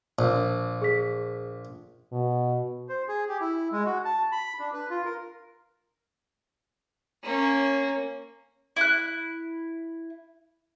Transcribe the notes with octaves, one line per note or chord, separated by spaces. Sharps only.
A#1
G#4 B6
B2
C5
G#4
G4
E4
G#3
F#4
A5
B5
D4
B4
F4
A#4
A#3 C#4
E4 F#6